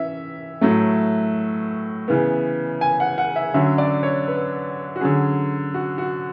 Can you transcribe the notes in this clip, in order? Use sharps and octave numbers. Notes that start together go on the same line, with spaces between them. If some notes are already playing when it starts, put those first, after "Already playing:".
Already playing: E3 C#4 E5
A2 F#3 A3
C#3 E3 B3
G#5
F#5
F#5
E5
D3 F#3 C#4 E5
D5
C#5
B4
F#4
D3 F#3 C#4 G#4
F#4
F#4